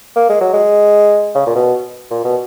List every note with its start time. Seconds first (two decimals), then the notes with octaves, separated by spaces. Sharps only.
0.16 A#3
0.29 G#3
0.41 F#3
0.54 G#3
1.35 C#3
1.47 A#2
1.56 B2
2.11 A#2
2.24 B2